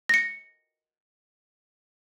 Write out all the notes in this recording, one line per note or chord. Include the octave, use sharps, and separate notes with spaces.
A#6 C#7